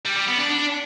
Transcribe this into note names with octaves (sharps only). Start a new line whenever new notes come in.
G3
G3
B3
D4
D4